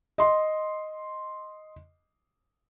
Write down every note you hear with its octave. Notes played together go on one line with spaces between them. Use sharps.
D#5 C6